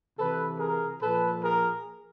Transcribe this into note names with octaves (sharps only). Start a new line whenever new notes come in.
C3 E3 A4 B4
G#4 A#4
A#2 F3 A4 B4
G#4 A#4